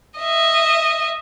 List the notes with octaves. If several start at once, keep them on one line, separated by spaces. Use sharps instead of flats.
D#5 E5